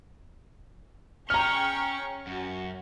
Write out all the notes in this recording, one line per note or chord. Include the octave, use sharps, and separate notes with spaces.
C#4 G#4 G5 A#5 C#6 F6
F#2 F#4